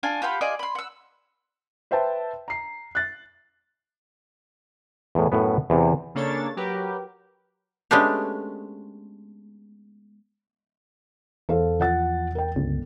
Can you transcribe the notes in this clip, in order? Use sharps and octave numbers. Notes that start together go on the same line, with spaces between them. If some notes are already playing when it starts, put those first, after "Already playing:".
D4 F4 G#4 G#5
F4 G4 F#5 B5
F4 G#4 D5 D#5
B5 C6
F#5 E6
B4 C5 E5 G5 A5
A#5 C7
F#6 A6
E2 A2
F#2 A2 B3
E2 C3
C#3 A#3 D4 A4 C#5 A6
F#3 G4 A#4 B4
G#3 A3 B3 C#4 D4 G4
E2 A4 C5 F5
F3 F#5 A6
A#4 G5
G1 C#2